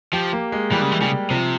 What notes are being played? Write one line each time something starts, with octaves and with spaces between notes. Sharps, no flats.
F3 G4
A#3
G#3
E3 G3
C#3
E3
C#3 G3
C3 F3